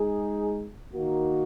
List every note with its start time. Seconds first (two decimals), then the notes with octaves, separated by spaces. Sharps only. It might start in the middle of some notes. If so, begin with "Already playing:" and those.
Already playing: G#3 D#4 G#4
0.94 D#3 A#3 D#4 F#4